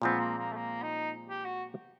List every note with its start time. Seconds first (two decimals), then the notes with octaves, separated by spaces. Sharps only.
0.02 A#2 F3 G#3 B3 C4
0.20 A#3
0.38 A#3
0.52 A3
0.56 A#3
0.82 D#4
1.28 G4
1.45 F#4